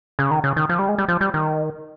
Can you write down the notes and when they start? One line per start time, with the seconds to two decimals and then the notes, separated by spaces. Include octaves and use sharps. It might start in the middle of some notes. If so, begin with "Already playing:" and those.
0.19 C#3
0.31 D#3
0.44 C#3
0.56 D#3
0.69 F3
0.79 G3
0.88 G#3
0.98 G3
1.08 F3
1.21 G3
1.34 D#3